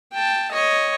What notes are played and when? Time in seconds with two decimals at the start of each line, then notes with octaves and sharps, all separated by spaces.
0.13 G5 A5
0.52 C#5 D#5